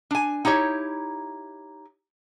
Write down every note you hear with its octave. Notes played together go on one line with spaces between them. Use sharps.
D4 G#5
D#4 E4 G4 C#5